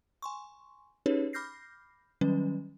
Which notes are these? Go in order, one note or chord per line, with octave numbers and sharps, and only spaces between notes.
G#5 C6 C#6
C#4 D#4 G4 G#4 B4 C#5
B5 D6 F6 G6 A#6 C7
D#3 F#3 G3 C#4 B4